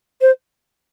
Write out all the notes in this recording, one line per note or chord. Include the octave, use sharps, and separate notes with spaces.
C5